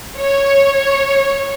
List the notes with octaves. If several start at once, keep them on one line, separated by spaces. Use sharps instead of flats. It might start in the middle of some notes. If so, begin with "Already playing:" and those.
C#5